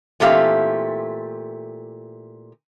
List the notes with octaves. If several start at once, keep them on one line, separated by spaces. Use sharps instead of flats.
A#2 E3 A3 C4 G4 F5